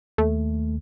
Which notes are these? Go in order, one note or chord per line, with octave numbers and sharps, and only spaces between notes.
D#2 A3